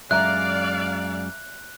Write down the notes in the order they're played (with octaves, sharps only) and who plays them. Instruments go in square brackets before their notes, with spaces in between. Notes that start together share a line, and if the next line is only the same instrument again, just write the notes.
[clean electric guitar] F#2 G#3 [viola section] D5 F5 [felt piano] E5 A#5 [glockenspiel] F#6